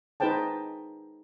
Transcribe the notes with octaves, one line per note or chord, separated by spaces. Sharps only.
D#4 G#4 B4 C5 G5 A5